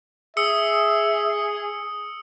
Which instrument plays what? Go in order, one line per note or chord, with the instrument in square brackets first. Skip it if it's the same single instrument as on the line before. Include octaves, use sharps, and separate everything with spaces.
[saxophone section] G#4 [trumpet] E5 [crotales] D#6 E6 C#7